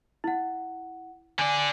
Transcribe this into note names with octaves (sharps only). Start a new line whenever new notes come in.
E4 F#5
D3 D5 G#5